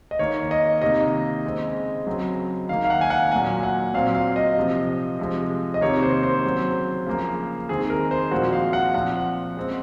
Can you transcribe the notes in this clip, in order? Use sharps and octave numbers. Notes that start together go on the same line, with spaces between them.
D#5
D#3 A#3 C#5
D#5
C3 D#3 A#3 D#5
C#3 G#3 C4
C#3 F#3 C4
D#3 A#3 F5
F5
F#5
G#5
F#5
A#2 F#3 A#3 G#5
F#5
A#2 F#3 C4 F5
F5
D#5
C3 F3 C4
C3 F3 G#3
D#5
C3 D#3 A#3 C#5
C5
C5
C#3 F#3 C4
C#3 F3 A#3
D#3 G#3 C4 G#4
A#4
C5
A#2 F3 G#3 C4 F#4
F5
F#5
A#2 F3 C4 F#5
C#3 G#3 C4